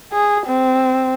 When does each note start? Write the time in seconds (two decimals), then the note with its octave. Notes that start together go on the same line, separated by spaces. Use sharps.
0.13 G#4
0.46 C4